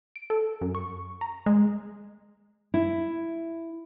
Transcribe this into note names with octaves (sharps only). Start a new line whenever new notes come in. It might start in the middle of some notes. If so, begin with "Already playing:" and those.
D7
A4
F#2
C#6
A#5
G#3
E4